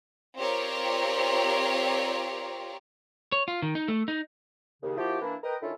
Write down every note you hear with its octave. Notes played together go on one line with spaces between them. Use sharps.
C4 F4 G4 A#4 C#5 D5
C#5
F4
D#3
D#4
A3
D#4
D#2 C#3
F3 A#3 E4 F#4 G4
E3 A#3 D4 E4
A#4 B4 D#5 G5
D3 D#3 C#4 E4 F4 A4